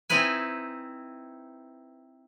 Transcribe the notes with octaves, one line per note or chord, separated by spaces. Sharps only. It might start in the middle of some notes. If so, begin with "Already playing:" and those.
C4 D#4 E4 B4 G#5